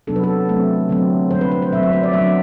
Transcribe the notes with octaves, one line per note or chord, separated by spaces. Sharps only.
C3 F#3 B3 D4 A4
B4
A4
F#3 A3 C4
D3 F#3 A3 C4
D3 G3 C4 C5
B4
B4
C5
B2 F#3 C4 E5
E5
C5
D5
F#3 B3 D4 E5